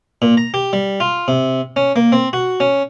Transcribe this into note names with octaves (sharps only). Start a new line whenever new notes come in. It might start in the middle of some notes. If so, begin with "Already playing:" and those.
A#2
A#5
G4
G3
F4
C3
C#4
A#3
C4
F#4
C#4